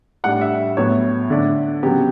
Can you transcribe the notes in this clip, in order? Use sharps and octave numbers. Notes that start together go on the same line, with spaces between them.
A2 G3 D4 F#5
E5
A2 F#3 B3 C#5
D3 A3 D4
C#3 F#3 B3 G4